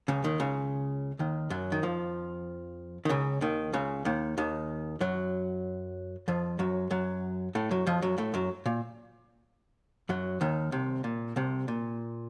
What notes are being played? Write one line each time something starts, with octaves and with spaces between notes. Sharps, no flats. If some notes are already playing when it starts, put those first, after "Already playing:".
C#2 C#3
D#2 D#3
C#2 C#3
D#2 D#3
F#2 F#3
D#3
F2 F3
D#3
C#2 C#3
D#2 D#3
C#2 C#3
D#2 D#3
D#2 D#3
F#2 F#3
F2 F3
F#2 F#3
F#2 F#3
A2 A3
F#2 F#3
F2 F3
F#2 F#3
A2 A3
F#2 F#3
A#2
F#2 F#3
D#2 D#3
C2 C3
A#2
C2 C3
A#2